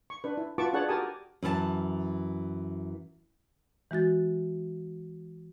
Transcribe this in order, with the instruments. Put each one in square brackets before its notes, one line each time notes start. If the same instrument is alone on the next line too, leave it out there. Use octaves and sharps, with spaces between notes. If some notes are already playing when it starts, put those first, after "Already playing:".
[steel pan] C#6
D4 B4
E4
F4 F#4 B4 A5 C#6 D6
D4 G#4 B4 C#5 F#5 A5
F#4 G4 A#4 G#5 A5 D#6
[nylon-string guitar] F#2 E3 G#4 A5
[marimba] E3 G#3 F#4 A6